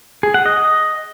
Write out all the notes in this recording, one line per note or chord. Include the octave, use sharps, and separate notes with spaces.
G#4
F#5
D#5